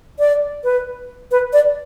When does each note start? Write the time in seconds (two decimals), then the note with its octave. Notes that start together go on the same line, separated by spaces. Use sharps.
0.19 D5
0.64 B4
1.31 B4
1.53 D5